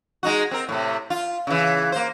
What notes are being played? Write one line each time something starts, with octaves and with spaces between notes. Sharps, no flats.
G#3 D#4 F#4
C4 A#4
A2 C3
F4
C#3 E3
A#3 C5